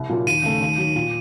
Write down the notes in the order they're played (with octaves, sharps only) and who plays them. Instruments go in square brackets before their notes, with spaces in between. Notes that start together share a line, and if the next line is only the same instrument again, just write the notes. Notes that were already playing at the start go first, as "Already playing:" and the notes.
Already playing: [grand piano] C2
A#2 F#3 A#3 F4
[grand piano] D#2 [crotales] D#7
[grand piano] C#3 A3
D#2
D#3 F#3
A#2